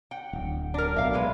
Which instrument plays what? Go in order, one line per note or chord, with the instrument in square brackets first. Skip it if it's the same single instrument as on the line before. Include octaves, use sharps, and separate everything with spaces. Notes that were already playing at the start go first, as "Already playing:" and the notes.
[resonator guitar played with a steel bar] F#5 G5
[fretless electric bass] D1
[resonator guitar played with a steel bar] D4 A#4
[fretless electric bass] B1 B2 [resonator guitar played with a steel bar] E5 F5
[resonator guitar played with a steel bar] A#2 G#3 B4